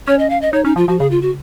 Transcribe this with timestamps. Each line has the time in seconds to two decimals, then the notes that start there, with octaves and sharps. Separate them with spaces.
0.07 C#4 C#5
0.19 D#5
0.30 F5
0.42 D#5
0.53 D#4 C#5
0.65 C#4 D#4
0.76 F3 F4
0.88 F3 F#4
0.99 C#3 G#4
1.11 F4
1.22 F#4